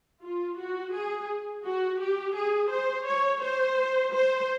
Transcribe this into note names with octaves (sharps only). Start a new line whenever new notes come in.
F4
F#4
G#4
F#4
G4
G#4
C5
C#5
C5
C5